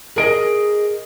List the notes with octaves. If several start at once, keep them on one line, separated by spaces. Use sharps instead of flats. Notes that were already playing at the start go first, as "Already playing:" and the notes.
G#4 A#4 D#5 D7